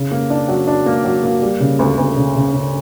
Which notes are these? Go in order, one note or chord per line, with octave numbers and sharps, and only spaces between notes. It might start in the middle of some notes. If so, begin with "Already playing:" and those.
Already playing: C#3
A#3
D4
F#3
D4
A#3
F#3
A#3
G3
C#3
D2
D2
C#3
C#3
C#3